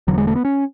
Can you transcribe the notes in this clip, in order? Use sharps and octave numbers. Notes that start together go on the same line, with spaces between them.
E1 E2 D3 F#3
G#3
A3
B3
C#4